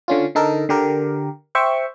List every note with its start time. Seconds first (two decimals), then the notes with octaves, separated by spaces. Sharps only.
0.08 D3 C#4 F4
0.35 D3 D#4 A4 A#4
0.69 D3 G4 A#4
1.55 C5 E5 G5 C#6